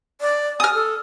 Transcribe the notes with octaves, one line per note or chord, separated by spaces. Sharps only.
D5
G#5 D#6 F6
A4